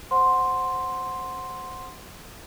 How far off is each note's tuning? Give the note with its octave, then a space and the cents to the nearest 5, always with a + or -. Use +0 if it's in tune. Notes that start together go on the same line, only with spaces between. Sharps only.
C5 +0 F#5 -10 C6 +0